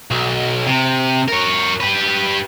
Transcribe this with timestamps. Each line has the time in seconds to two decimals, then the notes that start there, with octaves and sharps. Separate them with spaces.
0.11 B1
0.67 C3
1.28 A#4 C#5
1.80 G4 B4